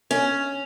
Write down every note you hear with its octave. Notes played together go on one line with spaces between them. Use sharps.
C#4